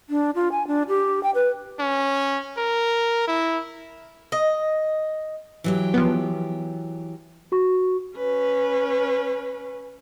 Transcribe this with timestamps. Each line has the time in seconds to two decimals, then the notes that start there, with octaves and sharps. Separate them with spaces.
0.10 D4
0.35 F4
0.52 G#5
0.67 D4
0.88 G4
1.23 G5
1.35 B4
1.80 C#4
2.58 A#4
3.28 E4
4.32 D#5
5.64 E3 F#3 G4
5.94 F3 B3
7.52 F#4 C#6
8.16 C#4 B4